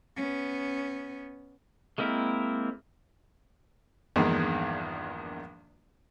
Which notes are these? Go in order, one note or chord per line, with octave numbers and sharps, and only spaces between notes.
B3 C#4
G#3 A#3 C4 E4 A#4
A#1 E2 G2 D#3 G#3 A#3